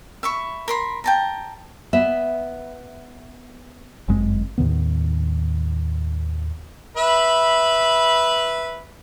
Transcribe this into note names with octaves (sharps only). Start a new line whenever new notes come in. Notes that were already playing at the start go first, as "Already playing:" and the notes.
E5 B5 C#6
A#4 B5 C6
G5 A5 A#5
B3 E5
G1 F#2 G#3 C4
D#2 A2 D#3 B3
B4 E5 B5